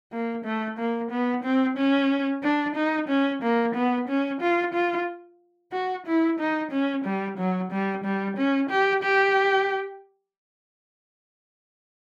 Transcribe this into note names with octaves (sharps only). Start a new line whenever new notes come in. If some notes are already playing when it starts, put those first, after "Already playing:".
A#3
A3
A#3
B3
C4
C#4
D4
D#4
C#4
A#3
B3
C#4
F4
F4
F#4
E4
D#4
C#4
G3
F#3
G3
G3
C#4
G4
G4